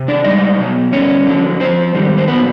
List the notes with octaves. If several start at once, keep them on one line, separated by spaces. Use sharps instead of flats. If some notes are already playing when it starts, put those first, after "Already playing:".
Already playing: C3
D4 D5
G#2 E3 G3 D#4 D#5
B2 F#3
G2 D3 G3 C#4 C#5
F2 D3 F#3
A2 F3 C4 C5
G#2 D#3 G3
C5
A#2 F#3 B3 B4